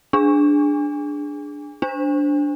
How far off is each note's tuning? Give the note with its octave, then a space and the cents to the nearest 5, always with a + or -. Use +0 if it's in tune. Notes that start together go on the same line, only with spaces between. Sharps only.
D4 +0 G#4 +0
D4 -10 C5 +0